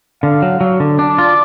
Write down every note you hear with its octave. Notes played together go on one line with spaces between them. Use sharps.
D3 F5
F#3
F#3
D3
D4 D5
F4